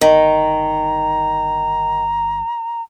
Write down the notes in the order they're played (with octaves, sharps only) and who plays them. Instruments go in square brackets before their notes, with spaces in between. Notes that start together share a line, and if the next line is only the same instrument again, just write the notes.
[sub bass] G1 [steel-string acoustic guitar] D#3 [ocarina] A#5